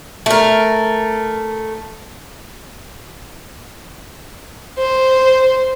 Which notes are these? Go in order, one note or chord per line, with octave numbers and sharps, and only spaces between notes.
A3 A#4
C5